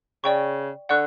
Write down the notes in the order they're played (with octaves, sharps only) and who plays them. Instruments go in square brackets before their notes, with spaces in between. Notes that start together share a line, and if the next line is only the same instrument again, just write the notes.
[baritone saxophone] C#3 [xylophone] D5 G5 C#6
[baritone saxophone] D3 [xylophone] D5 F#5 C#6 F#6